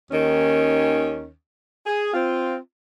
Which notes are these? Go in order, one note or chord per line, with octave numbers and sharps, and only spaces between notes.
D#2 D#3 C#4
G#4
C4 F4